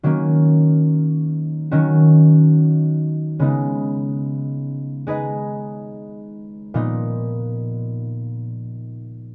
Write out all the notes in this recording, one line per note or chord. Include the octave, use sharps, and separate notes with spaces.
D#3 F#3 A#3 C#4
D#3 F#3 C#4 F#4
C#3 G#3 B3 D#4
G#3 D#4 G#4 B4 D#5
A#2 F3 B3 D#4